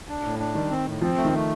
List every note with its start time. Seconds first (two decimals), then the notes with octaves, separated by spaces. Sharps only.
0.09 D4
0.24 A2
0.39 D4
0.55 D#3 G3
0.70 C4
0.86 A2
1.01 F3 C4
1.17 A3
1.25 D#3
1.33 A3